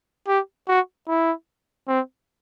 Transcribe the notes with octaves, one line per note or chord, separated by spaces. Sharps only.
G4
F#4
E4
C4